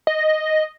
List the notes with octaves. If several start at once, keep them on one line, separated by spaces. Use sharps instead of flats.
D#5